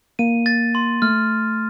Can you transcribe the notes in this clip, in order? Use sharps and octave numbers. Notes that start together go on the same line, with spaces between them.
A#3 D#7
A6
C6
A3 F6